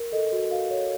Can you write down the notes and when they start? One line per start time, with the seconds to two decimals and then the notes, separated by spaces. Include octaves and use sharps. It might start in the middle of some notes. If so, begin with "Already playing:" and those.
Already playing: A#4
0.12 A4 D#5
0.32 F#4
0.51 F#4 F5
0.70 C#5